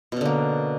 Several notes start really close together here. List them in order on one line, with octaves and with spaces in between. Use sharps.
B2 C#4 D3 A#3